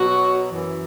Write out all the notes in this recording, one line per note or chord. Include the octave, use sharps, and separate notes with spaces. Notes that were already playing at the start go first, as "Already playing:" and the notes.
Already playing: B2 F#3 F#4
F#2 E3